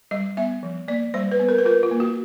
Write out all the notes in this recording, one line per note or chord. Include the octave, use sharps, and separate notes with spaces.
G3 D#5
B3 E5
F3
A#3 D5
G3 C5
B4
B3
A#4
B4
F4 A#4
F4
A#3
F#4